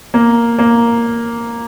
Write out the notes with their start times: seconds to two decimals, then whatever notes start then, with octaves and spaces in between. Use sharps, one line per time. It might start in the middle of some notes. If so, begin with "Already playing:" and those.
0.14 A#3
0.59 A#3